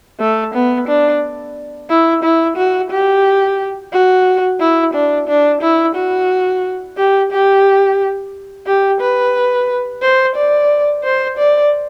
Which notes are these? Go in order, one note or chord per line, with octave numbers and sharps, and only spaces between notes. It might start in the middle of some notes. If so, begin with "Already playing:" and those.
A3
B3
D4
E4
E4
F#4
G4
F#4
E4
D4
D4
E4
F#4
G4
G4
G4
B4
C5
D5
C5
D5